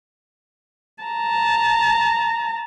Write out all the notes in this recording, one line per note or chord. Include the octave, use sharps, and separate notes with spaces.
A5 A#5